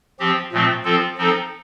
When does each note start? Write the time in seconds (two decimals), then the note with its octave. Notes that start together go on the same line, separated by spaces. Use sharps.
0.20 F3 C4 G4
0.52 A#2 F3 A3 C4
0.84 F3 C4 F4 A4
1.17 F3 C4 D#4 A4